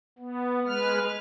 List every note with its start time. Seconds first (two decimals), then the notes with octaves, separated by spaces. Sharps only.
0.19 B3
0.67 G#3 B4 F6